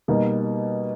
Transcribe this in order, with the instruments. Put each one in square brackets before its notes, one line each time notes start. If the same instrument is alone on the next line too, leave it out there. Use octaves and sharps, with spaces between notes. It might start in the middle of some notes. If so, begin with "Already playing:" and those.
[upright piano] B2 G3 A#3 D#4